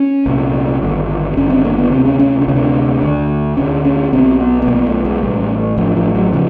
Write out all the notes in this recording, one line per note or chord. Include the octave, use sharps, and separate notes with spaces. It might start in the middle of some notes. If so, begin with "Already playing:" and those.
Already playing: C#4
C2 A#2
G#1 G2 D3
G#1 G2 D3 C#4
C4
A#3
B3
D2 C3 C4
C#4
C#4
D4
D2 C3 C#4
D4
D2 D3
D2 D3 C#4
C#4
B1 B2 C4
B3
B3
B1 B2 A#3
A3
G#3
A1 A2 G3
A1 A2 F3
F3
F#3
C#3 F3